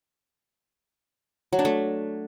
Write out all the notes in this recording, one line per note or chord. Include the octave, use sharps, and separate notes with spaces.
F#3
D4
A3